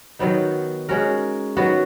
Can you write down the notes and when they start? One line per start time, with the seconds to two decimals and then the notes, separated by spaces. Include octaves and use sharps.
0.19 D#3 F#3 B3 D#4
0.89 G#3 C#4 F#4 A#4
1.57 D#3 F#3 B3 F#4